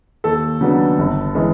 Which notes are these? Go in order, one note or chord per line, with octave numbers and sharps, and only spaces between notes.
D#2 A4
C#3 F#3 B3 D4
G1
E3 G#3 C#4